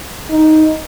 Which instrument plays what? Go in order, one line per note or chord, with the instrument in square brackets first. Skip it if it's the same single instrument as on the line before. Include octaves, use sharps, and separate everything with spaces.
[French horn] D#4